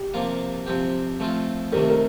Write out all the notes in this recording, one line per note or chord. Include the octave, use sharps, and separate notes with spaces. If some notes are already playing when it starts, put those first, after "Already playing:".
Already playing: G4
C3 F3 A#3 F4
C3 F3 C4 G4
F3 A3 C4 F4
C3 D#3 A3 G4 A#4
A#4